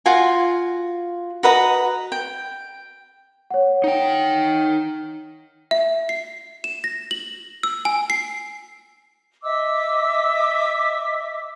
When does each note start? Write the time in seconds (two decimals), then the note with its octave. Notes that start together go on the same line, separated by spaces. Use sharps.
0.06 F4 F#4 G#5
1.43 F#4 B4 D#5 A#5
2.12 G5
3.51 C#5 F#5
3.84 D#4 G5
5.71 E5
6.09 C7
6.64 E7
6.84 A#6
7.11 F#7
7.63 E6
7.85 G#5
8.10 C7
9.42 D#5 E5 D6 E6